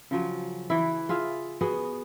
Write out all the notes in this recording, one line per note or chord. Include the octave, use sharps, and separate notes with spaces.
C#3 F3 F#3
E3 E4
F4 G#4 E5 F5
B3 F#4 G#4